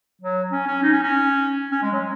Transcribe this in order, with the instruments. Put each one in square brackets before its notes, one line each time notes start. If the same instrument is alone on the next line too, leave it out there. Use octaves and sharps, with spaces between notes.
[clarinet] F#3
C#4
C#4
D#4
C#4
C#4
C#4
G#3
F#3